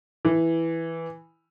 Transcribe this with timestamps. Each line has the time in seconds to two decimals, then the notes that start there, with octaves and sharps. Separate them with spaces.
0.25 E3